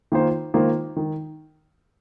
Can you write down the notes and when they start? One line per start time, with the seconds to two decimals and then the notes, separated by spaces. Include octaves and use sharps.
0.12 D#3 A#3 F4 C5
0.54 D#3 A#3 F4 C5
0.97 D#3